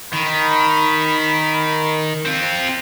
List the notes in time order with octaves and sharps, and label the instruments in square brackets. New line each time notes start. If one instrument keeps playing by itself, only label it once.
[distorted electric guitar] D#3 [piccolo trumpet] B5
[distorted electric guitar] C4 F4